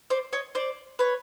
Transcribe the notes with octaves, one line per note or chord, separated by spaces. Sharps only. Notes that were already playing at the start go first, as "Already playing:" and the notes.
C5 D5
C#5 D#5
C5 D5
B4 C#5